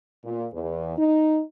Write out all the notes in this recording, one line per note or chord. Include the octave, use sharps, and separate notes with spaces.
A#2
E2
D#4